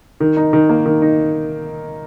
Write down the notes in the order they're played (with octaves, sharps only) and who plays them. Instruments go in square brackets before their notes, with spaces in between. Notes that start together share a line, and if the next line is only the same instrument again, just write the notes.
[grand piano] D#3
D#4
D#3
A#3
D#3
D#4